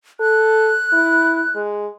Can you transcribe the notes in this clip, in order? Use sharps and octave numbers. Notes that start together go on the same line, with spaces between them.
A4 F#6
E4
G#3